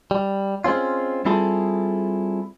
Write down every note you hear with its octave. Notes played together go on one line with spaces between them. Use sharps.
G3
G#3 C4 C#4 F4
G3 C4 E4 F4 G#4 A4